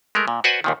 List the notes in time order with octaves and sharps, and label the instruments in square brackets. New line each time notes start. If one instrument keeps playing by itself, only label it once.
[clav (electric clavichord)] G#3 A3 A#4
A#2
F#4 B4 C5 D5 F#5 G#5
D#2 A#2 D#3